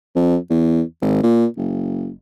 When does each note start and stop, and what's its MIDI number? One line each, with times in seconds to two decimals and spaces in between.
0.16 0.37 41
0.50 0.82 40
1.02 1.21 32
1.23 1.46 46
1.57 2.12 30